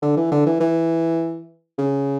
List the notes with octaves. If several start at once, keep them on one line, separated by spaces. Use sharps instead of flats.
D3
E3
D3
E3
E3
C#3